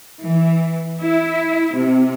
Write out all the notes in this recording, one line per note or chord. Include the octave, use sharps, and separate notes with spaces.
E3
E4
C3